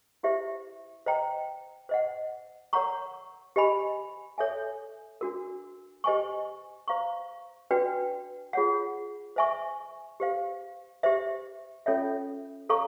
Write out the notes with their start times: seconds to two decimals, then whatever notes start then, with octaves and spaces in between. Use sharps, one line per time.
0.23 E4 G4 C5 E5
1.06 C5 D#5 G5 A#5
1.89 C5 D#5 F#5
2.73 A#4 C#5 F#5 A#5 C#6
3.56 G4 C5 D#5 G#5 B5
4.38 A4 C#5 E5 G#5
5.21 D4 F#4 A#4
6.04 G4 C5 D#5 G#5 C#6
6.88 C5 F5 A#5 C#6
7.71 D4 F#4 B4 D5 G5
8.53 F4 G#4 C#5 F#5
9.36 C5 E5 G#5 C#6
10.20 G4 C5 F5
11.03 G4 C5 E5
11.86 C#4 F4 A4 C#5 E5
12.69 A4 C#5 F5 A#5 C#6